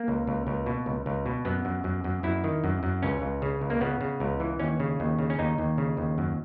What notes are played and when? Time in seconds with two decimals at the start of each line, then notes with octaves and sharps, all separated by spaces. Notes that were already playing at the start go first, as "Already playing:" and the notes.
Already playing: A#3
0.08 C#2
0.27 C#2
0.47 C#2
0.66 B2
0.86 C#2
1.06 C#2
1.26 B2
1.45 F#2 B3
1.65 F#2
1.84 F#2
2.04 F#2
2.23 F#2 E4
2.44 D#3
2.64 F#2
2.83 F#2
3.02 C#2 C#4
3.22 C#2
3.42 C#3
3.61 C#2
3.70 A#3
3.81 C#3 B3
4.01 C#3
4.20 C#2
4.40 E3
4.59 D#2 C#4
4.80 C#3
5.00 D#2
5.19 C#3
5.30 C#4
5.39 D#2 D#4
5.58 D#2
5.78 C#3
5.97 D#2
6.18 F#2